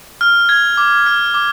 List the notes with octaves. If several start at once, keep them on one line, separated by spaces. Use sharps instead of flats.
F6
G#6
D6
F6
D6